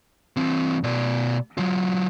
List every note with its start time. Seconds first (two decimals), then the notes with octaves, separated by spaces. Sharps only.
0.37 E3 C4
0.84 B2 D5
1.58 F#3 F4